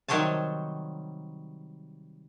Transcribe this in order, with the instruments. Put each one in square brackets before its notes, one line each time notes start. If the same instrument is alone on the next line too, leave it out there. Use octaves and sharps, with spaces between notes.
[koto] C3 D#3 F#3 G3 C#5 A5